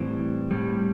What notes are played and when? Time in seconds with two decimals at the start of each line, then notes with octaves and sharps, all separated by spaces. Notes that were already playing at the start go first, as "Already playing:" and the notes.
Already playing: A2 E3 G3 C4
0.51 A2 G3